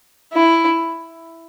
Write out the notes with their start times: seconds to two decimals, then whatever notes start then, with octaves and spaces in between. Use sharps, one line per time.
0.33 E4